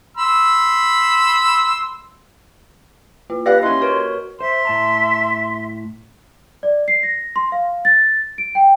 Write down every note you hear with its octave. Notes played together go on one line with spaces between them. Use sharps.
B5 C6 E6
A#3 F4
G4 B4 D5 F5 F#5 A#6
C#4 E4 D#5 C6
F#4 A#4 B4 C#5 C#6
C5 E5 C6
A2 A5 A#5
D5
C7
A#6
C6
F5
A6
D7
G5